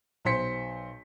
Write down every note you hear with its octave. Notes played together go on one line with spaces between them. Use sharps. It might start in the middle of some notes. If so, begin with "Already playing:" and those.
B1 C5 C6 B6 C#7